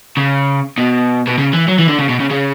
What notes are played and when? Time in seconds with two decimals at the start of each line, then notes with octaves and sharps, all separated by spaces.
0.17 C#3
0.78 B2
1.27 B2
1.38 C#3
1.54 E3
1.69 F#3
1.79 E3
1.89 D3
1.99 C#3
2.09 B2
2.20 C#3
2.30 C#3